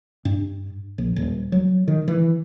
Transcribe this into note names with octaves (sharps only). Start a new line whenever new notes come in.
G2
A#1
D#1
F#3
D#3
E3